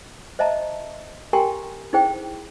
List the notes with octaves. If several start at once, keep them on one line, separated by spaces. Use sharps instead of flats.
C5 D#5 E5 A5 A#5
G4 A#4 G5 G#5 A#5 C6
D#4 E4 G#4 C5 G5